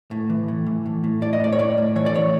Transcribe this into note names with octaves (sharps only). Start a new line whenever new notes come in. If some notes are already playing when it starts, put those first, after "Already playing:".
A2
E3
A2
E3
A2
A2
A2 D5
D#5
A2 D5
C#5
A2 D5
A2
E3 C#5
D5
A2 C#5